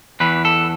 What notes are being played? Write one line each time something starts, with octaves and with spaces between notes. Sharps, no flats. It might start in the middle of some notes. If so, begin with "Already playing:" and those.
E2 E3 B4
A4